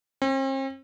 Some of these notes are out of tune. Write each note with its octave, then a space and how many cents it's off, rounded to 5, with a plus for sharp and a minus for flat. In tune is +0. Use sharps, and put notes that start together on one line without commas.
C4 +45